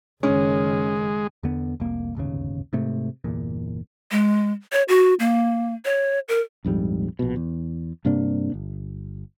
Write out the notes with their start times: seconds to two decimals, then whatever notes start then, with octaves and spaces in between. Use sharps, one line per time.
0.23 F#1 D#3 G#3 C#4
1.43 E2 D3 B3
1.80 F1 C2 A#3
2.15 D1 G1 D#2 C#3
2.73 G#2 C3 A3
3.24 G1 E2 A#2
4.11 G#3
4.72 C#5
4.88 F#4
5.19 A#3
5.85 C#5
6.28 A#4
6.65 A#1 F2 G#2 G3
7.19 A#1 B2
7.36 E2
8.05 G2 C3 A#3 D4
8.54 G1